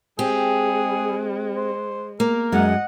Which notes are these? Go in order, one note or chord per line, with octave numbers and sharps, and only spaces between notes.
G#3 C4 G4 G#4
C5
A#3 A#4
F#2 G#3 D#5 F#5